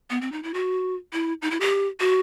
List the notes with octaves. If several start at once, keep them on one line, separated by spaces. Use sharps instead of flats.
B3
C4
D#4
E4
F#4
E4
D#4
E4
G4
F#4